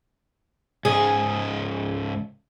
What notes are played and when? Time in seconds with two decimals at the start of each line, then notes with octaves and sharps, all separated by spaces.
0.85 C#2 G#2 G#4